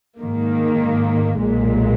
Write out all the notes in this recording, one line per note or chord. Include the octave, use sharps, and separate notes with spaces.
G#2 D#3 A#3
B1 A#2 G#3